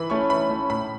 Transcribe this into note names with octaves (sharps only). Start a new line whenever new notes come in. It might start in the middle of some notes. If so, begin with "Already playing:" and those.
Already playing: E3 B5
A3 C#4 C#6
E3 B5
A3 C#4
A2 B5